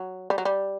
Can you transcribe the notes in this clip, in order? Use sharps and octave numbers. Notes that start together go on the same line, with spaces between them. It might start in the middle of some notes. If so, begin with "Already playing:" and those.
Already playing: F#3
G3
F#3
G3